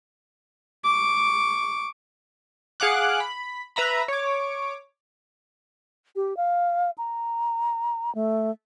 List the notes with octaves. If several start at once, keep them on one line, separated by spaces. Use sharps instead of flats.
C#6 D6
G#4 F5 F#5 D6 F#6
B5
B4 E5 A#5 B5
C#5 D6
G4
F5
A#5
A3